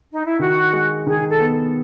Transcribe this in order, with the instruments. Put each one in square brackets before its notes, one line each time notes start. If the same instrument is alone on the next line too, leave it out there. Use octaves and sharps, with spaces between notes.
[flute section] D#4
E4
[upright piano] D#3 [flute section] F#4
[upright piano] G#3
[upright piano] D#3 [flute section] G#4
[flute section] A4
[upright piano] B3